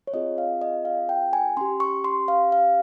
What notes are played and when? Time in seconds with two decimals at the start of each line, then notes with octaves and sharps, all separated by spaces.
0.07 C#5
0.13 C4 F4 G#4 D#5
0.38 F5
0.61 D#5
0.85 F5
1.09 G5
1.33 G#5
1.57 C#4 G4 C6
1.80 C#6
2.04 C6
2.28 F5
2.52 F5